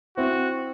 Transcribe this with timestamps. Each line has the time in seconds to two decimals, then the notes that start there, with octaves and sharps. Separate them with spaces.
0.17 C4 E4 F#4